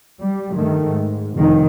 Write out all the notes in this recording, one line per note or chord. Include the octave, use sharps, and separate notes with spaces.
G3
G2 D#3 A3
G#2
F1 F2 D#3